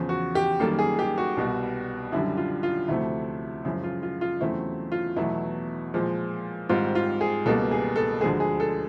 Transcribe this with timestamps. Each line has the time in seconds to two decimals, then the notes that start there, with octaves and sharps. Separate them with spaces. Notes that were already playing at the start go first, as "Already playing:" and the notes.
Already playing: E2 C#3 F3
0.09 F#4
0.35 G4
0.60 F#2 D#3 G3 A#3 A4
0.79 G#4
0.99 G4
1.18 F#4
1.37 C2 B2 G3
2.12 F#2 D3 G3 E4
2.37 F4
2.63 F4
2.88 D2 C3 F3 A3 E4
3.65 F#2 C#3 F3 G#3 E4
3.84 F4
4.03 F4
4.21 F4
4.41 E2 C#3 F#3 A3 C4 E4
4.92 F4
5.16 E2 B2 F#3 A3 E4
5.94 A#2 F3 G#3
6.69 G#2 D#3 G3 C4 F4
6.95 F4
7.21 G#4
7.45 C#2 B2 G3 A#3 A4
7.71 G#4
7.96 A4
8.21 D2 D3 F3 G#3 G#4
8.40 G#4
8.60 A4